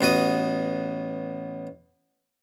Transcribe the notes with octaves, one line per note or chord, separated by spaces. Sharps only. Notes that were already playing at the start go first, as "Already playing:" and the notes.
A1 B3 F#4 D#6